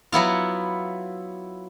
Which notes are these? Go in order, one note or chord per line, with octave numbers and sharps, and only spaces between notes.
F#3 B3 E4 F4